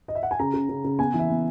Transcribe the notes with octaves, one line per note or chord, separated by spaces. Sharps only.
D#5
E5
F#5
G#5
C#3 A#5
C#3
C#3
C#3
B3 G#5
E3
E5
B3